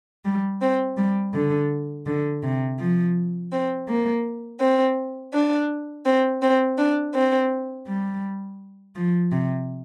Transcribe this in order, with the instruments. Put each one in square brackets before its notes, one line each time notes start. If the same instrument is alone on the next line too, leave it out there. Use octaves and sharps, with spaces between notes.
[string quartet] G3
C4
G3
D3
D3
C3
F3
C4
A#3
C4
D4
C4
C4
D4
C4
G3
F3
C3